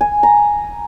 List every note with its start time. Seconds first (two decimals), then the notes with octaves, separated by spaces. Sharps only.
0.01 G#5
0.23 A#5